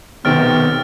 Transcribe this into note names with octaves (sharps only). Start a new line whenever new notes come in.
B1 C3 D#3 B3 F6 A6 D7